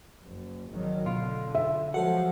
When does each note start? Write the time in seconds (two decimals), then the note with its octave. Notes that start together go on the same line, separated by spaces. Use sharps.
0.25 F#1
0.72 G#1 D#3 F#3
1.06 B2 D3 F4
1.55 E5
1.94 F3 F#3 G#3 F#4 A4 C5 F#5